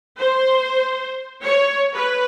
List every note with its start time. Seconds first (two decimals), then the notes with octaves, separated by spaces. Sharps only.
0.18 C5
1.43 C#5
1.94 B4